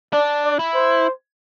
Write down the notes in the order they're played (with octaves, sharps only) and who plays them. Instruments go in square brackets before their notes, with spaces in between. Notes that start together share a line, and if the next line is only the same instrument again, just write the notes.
[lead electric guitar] D4 [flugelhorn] D5
[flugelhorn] D5
[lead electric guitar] E4
[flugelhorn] C5